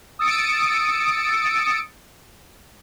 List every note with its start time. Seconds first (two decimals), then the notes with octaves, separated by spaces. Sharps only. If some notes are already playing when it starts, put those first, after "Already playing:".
0.19 D#6 E6 A6 C#7 D7